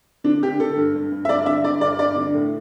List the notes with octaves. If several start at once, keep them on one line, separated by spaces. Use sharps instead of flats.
D3 D4
D3 G4
D3 A4
G2
G2
G2
E5
G2 D5
D3 E5
D3 D5
G2 D5
G2 D5
D3
A2